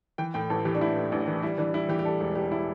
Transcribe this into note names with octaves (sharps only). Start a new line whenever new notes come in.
E3 G5
A2 G5
A1 A4
E3 G4
D4
A1 E4
A2
A1 D4
E3
G3 E4
E3 D4
G3 E4
E3 G4
G4
G3 A4
E1
G3 G4
E4